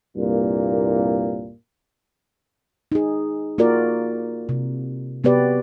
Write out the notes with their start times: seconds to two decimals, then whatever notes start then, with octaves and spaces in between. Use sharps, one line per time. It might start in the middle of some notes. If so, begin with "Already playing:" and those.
0.17 C2 G2 A#2 A#3
2.92 D#4 G#4
3.58 A#3 F4 F#4 A#4 D5
4.49 C3
5.24 C3 B3 F#4 G4 B4 D5